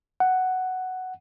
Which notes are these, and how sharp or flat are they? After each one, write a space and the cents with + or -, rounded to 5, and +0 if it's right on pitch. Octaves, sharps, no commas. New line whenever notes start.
F#5 +5